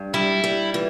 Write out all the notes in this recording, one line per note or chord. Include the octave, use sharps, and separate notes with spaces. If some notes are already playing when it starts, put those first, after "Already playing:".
Already playing: G2
G3 E4
G3
E3